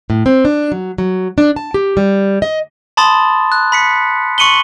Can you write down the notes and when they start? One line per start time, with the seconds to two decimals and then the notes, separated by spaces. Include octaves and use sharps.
0.10 A2
0.26 C4
0.45 D4
0.72 F#3
0.98 F#3
1.38 D4
1.56 A5
1.74 G4
1.97 G3
2.42 D#5
2.97 A5 B5 C6 D#6 A6
3.52 F#6
3.72 B5 B6 C#7
4.38 C6 C#6 C#7 D#7 F#7 G7